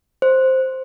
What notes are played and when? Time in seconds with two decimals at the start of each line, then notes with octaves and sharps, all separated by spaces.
0.22 C5